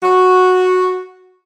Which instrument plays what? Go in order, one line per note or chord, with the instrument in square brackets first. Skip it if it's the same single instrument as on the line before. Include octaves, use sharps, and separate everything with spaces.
[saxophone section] F#4